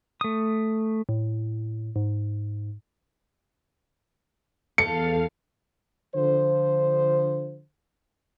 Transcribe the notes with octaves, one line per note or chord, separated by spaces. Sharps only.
A3 D#6
A2
G#2
E2 A4 F5 C#7
D3 F3 C5